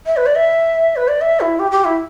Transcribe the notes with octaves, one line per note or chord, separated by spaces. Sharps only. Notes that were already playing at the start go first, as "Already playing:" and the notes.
E5
B4
D5
E5
B4
D5
E5
E4
G4
G4
E4